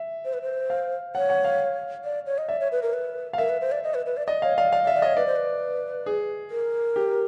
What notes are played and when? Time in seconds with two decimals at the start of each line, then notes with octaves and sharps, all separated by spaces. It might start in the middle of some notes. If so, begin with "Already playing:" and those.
Already playing: E5
0.25 C5
0.33 B4
0.42 C5
0.70 F5
1.15 C#5 F#5
1.30 F#5
1.44 F5
2.04 D5
2.26 C#5
2.38 D#5
2.49 D5 E5
2.60 C#5
2.72 B4
2.82 A#4
2.93 B4
3.33 F5
3.38 A#4 E5
3.49 B4
3.61 C5
3.72 D5
3.83 D#5
3.94 B4
4.06 B4
4.17 D5
4.27 D5 D#5
4.42 C#5 F5
4.57 D5 F5
4.72 D5 F5
4.84 D5
4.87 E5
4.95 D5
5.02 C#5 D#5
5.16 B4 D5
5.26 C5
5.36 B4
6.06 G#4
6.51 A#4
6.96 G4